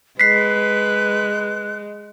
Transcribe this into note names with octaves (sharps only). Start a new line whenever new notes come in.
G#3 B4 F#6 B6 C7